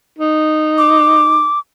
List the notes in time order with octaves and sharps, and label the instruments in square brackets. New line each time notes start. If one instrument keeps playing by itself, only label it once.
[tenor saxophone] D#4
[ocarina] D6